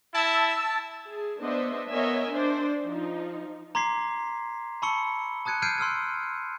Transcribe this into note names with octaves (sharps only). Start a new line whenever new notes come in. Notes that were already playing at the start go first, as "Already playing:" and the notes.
E4 A5 E6
G#4
B3 D4 C5 D#5 E5
B3 A#4 C#5 D#5 E5 G#5
D4 C5 D5
F3 D#4
A#5 C6 D6 G#6 B6 C7
A5 B5 C#6 E6 C#7 G7
A5 D#6 F#6 G#6 C#7 D#7
F6 G6 G#6 C7 D7 D#7
C6 E6 F6 G#6